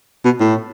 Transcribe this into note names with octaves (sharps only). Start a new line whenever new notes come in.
B2
A2